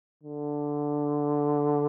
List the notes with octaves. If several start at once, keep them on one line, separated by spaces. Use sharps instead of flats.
D3